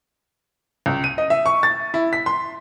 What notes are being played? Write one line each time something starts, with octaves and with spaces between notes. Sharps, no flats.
C#2
D#7
D#5
E5
C#6
A6
E4
B6
C6